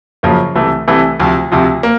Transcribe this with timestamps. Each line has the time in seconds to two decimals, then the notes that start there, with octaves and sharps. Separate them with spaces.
0.23 F#2 C#3 F3 A#3
0.55 C2 C3 E3 A3
0.88 C2 C3 E3 A3
1.20 D2 C3 F3
1.52 D2 C3 F3
1.83 A#3